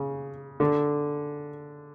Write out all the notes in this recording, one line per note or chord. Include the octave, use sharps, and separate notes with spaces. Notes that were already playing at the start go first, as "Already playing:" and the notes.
Already playing: C#3
D3